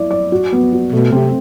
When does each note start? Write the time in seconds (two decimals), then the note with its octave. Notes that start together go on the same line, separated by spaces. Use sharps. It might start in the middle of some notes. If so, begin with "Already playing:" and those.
Already playing: E4 D5
0.11 D5
0.32 F#4
0.52 B3
0.73 F#4
0.93 B2 A3
1.12 C3 C4